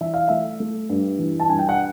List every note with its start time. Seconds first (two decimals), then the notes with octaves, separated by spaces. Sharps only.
0.01 E3 E5
0.14 F5
0.28 A3 E5
0.60 A3
0.89 G2
1.19 E3
1.40 A5
1.49 G2 G#5
1.59 G5
1.69 F#5